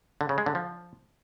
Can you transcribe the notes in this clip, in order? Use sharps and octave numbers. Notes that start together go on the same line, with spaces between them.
D3
C#3
G#3
D3
F3